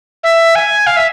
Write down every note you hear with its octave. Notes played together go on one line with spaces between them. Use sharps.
E5
G#5
F5
E5